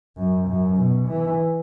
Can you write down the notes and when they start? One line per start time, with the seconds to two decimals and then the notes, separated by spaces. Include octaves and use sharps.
0.17 F#2
0.48 F#2
0.78 B2
1.08 E3